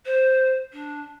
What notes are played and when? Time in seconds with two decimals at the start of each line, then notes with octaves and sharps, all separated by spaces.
0.06 C5
0.73 D4